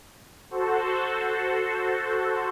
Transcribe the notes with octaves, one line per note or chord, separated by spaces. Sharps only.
F#4 A4 C5